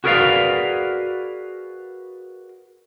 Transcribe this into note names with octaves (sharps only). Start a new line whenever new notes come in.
F#4 G#4 A#4 B4 D5 F5